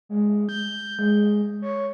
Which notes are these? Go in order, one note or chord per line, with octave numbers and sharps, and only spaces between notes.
G#3
G6
G#3
C#5